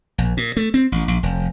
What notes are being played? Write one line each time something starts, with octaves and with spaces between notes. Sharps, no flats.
A#1
A#2
A3
C4
A1
A#1
F1